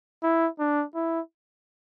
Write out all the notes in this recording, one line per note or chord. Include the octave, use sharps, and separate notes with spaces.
E4
D4
E4